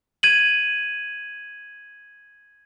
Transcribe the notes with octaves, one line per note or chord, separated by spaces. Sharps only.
G#6 D#7 F#7